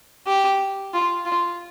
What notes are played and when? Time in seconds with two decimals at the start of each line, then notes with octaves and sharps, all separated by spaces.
0.27 G4
0.94 F4
1.25 F4